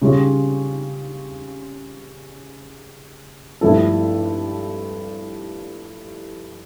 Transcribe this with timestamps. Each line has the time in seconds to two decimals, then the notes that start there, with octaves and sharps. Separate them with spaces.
0.02 C#3 G3 C#4 F4
3.61 G2 F3 A3 E4 A4